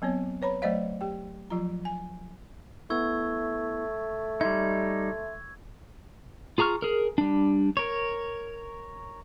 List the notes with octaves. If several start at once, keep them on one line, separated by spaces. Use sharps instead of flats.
F#3 B3 C4 C#5
B4 C#5 A#5 B5
F#3 A3 C5 D5 D#5 F5
G4 G5
F3 F#3 F4 A#5
G#5
A3 B3 E4 C#6 E6 G#6
G3 D#4 E5 C6 G#6
F4 G#4 A#5 C#6 F6
G#4 A#4
G3 D4
A#4 C#5